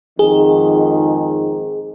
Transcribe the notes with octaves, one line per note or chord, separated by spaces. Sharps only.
F2 G#2 D#3 G#4